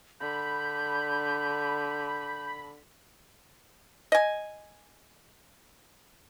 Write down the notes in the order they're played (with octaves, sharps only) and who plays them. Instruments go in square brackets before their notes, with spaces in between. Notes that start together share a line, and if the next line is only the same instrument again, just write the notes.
[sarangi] D3 [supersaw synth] B5 [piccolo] G6
[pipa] D#5 G#5